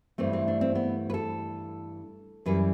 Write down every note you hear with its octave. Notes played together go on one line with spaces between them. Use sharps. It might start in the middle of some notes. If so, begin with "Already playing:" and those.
G2 E3 A3 C4
C4
D4
C4
B3
B4
A4
F#2 E3 G3 B4